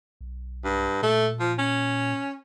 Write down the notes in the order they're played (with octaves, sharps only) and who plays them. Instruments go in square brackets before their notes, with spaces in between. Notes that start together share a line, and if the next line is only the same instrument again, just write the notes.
[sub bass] B1
[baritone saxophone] G2
[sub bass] A#2 [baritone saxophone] A3
[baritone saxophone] F3
C#4